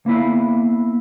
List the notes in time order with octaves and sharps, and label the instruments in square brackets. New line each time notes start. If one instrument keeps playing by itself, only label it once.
[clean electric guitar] A#3 B3 E4 F5